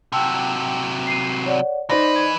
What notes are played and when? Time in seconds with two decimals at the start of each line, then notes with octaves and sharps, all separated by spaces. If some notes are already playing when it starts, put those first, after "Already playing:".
0.12 C3 F#3 G5 A5 E6
1.07 C7 D#7
1.46 C#5 D5 F#5
1.89 E3 D#4 B4 C5 D5 A#6
2.15 D#5 G#6